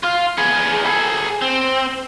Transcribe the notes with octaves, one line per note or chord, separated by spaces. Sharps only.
F4 F5
B3 G#4
G#4 A4
C4